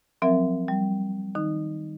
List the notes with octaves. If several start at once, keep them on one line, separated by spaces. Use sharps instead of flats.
F3 F#3 C4 A#4 E5
G3
D#3 D#4